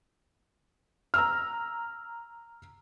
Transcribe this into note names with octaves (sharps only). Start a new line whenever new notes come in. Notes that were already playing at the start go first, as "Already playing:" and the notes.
A#5 E6 F6